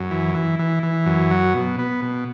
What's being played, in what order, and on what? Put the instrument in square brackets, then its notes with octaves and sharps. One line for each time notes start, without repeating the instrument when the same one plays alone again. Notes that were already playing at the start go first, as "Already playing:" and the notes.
Already playing: [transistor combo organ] F#2
E3
E3
E3
E3
F#2
F#3
B2
B3
B2